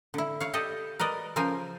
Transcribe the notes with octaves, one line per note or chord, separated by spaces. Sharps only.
D3 E4
C#5 F5
G4 A4 D5 D#5
A#4 B4 D5 D#5
C#3 F3 A#4 C5 G#5